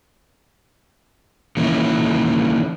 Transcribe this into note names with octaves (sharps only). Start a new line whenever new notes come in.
D#3 E3 A#3 C#4 E4